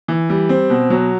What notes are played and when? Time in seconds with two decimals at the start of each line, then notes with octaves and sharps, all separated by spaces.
0.08 E3
0.30 G3
0.49 C4
0.70 B2
0.90 F#3